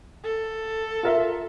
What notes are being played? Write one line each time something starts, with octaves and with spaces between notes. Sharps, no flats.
A4
F4 A#4 E5